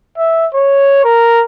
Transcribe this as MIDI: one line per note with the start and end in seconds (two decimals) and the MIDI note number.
0.17 0.47 76
0.54 1.01 73
1.04 1.42 70